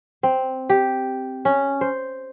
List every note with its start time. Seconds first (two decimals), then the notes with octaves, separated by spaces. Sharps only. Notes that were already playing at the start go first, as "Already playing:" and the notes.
0.23 C4
0.70 G4
1.45 C#4
1.81 C5